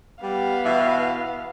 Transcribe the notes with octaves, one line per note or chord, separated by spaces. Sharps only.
G3 B3 F5
B2 E3 E5